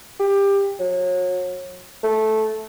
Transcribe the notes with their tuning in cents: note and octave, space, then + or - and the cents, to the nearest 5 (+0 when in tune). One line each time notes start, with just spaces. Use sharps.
G4 +20
F#3 -35
A3 -10